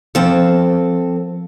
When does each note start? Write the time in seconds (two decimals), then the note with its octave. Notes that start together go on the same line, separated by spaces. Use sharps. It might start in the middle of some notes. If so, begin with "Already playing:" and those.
0.15 F3 C4 A4